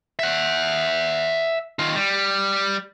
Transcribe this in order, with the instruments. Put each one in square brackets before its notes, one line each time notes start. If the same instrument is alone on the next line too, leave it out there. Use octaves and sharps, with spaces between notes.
[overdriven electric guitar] E5 F#5
D#3 F4
G3